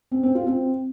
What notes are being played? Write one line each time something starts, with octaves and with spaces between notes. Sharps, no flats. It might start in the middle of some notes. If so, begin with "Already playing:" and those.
C4
C4
F4
C4